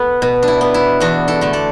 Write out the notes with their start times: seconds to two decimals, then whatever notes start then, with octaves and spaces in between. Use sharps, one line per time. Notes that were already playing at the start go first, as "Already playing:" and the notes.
Already playing: B3 A4
0.22 B2
0.43 D4
0.48 E4
0.61 B3
0.74 E4
1.00 E2 D4 F#4
1.28 E4 A4
1.41 D3 A3
1.53 A4 D5